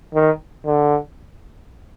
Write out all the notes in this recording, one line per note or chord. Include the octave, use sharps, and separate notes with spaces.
D#3
D3